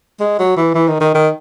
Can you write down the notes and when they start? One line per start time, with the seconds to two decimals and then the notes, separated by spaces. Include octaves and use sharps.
0.20 G#3
0.39 F#3
0.57 E3
0.75 E3
0.88 D#3
1.01 D#3
1.15 D#3